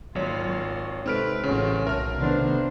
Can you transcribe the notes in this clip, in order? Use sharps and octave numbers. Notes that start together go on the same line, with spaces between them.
G#1 F#3 A#3 F4 C#5
C#6
C3 G#3 C4 D#4 A4 B4 F6 D7
A1 A2 C#3 C#4 F4 F#4
B1 A#4 E5 A5 F6
C3 D#3 A3 B3 D4 C5